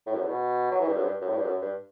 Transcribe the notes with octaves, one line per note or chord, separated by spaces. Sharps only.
A2
F#2
E2
B2
F#3
E3
G2
F#2
G2
F#2
A2
G2
F#2
G2